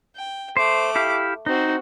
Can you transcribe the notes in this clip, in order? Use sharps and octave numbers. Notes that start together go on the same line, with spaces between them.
G5
A3 C5 D6
E4 G4 F5
C4 D#4 F#4